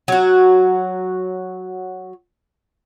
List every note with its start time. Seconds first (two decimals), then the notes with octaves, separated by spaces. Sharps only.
0.08 F#3 F#4